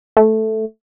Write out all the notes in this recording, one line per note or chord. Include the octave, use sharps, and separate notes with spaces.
A3